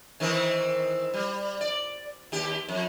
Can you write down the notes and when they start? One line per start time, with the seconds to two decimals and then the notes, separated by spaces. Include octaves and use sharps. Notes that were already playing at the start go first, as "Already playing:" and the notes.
0.20 D#3 E3 C4
1.14 G3
1.61 D5
2.32 D#2 G4
2.68 F2